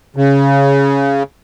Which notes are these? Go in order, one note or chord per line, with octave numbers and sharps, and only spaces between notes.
C#3